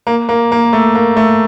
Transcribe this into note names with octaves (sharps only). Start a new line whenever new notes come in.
A#3
A#3
A#3
A3
A#3
A3